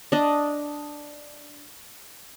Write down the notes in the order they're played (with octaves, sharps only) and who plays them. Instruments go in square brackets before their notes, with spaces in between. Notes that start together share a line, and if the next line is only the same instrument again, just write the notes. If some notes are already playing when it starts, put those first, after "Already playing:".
[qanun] D4 D#5